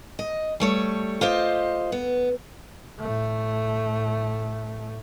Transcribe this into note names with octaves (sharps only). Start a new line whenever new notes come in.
D#5
G3 A3 C#5
F4 G4 C5 D#5
B3
A2 A3